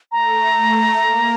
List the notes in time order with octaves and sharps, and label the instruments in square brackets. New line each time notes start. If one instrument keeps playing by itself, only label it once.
[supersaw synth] A3 [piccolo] A#5
[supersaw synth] A3
A#3